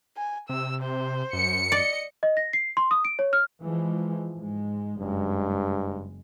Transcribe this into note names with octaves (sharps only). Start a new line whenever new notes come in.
G#5
C3 E6
C5
F#2 C#7
D5 D#5
D#5
A#6
C7
C6
D#6
D7
C#5
F6
E3 F3 G#3
G#2 G#3
F#1 G2 G#3